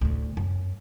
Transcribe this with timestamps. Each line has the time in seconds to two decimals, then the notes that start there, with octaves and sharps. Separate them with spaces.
0.01 D2 A2
0.37 F#2